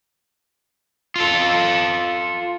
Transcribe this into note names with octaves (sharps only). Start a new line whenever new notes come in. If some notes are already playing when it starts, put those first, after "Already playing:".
F4 A4